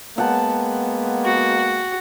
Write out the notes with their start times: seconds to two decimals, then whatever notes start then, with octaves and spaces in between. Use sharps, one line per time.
0.18 G#3 A#3 B3 F#5 G5 A5
1.25 F#4